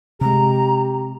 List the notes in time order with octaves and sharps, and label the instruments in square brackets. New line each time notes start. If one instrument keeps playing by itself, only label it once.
[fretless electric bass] C3 G#3 [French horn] G4 [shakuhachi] A#5